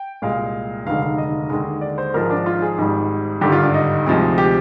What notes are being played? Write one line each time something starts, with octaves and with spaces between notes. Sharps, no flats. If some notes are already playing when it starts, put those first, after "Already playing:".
Already playing: G5
C2 A#2 G#3 F5
F1 D#2 D3 G#3 F5
F5
D#5
D#2 D3 G#3
D5
C5
G#1 G#2 F3 G#3 A#4
D4
F4
G#4
G#1 G#2 G3
G#1 G2 D3 G4
F4
D4
D#4
D2 C3 F3 G#3
G4